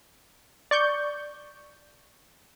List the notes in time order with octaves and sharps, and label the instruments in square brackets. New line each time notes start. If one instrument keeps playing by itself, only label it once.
[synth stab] D5 C#6 G6